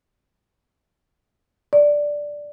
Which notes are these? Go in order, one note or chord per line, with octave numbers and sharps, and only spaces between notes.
D5